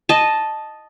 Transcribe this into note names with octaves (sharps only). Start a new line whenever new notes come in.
D#5 A5